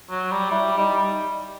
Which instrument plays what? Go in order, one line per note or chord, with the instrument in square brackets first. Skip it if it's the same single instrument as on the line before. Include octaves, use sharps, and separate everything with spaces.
[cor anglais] F#3
G3
[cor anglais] G3 [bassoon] E4
[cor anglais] G3 [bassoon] D#4